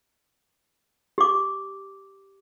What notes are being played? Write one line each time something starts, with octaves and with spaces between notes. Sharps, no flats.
G4 D6